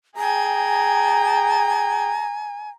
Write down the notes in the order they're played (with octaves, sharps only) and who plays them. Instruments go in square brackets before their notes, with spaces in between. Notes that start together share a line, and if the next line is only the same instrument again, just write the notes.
[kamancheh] G#4 G5 [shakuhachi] G#5 [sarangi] A#5